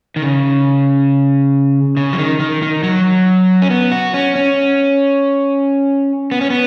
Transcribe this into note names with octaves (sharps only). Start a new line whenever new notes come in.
D#3
C#3
C#3
F#3
D#3
D#3
D#3
F#3
C#4
B3
F#4
C#4
C#4
B3
C#4
B3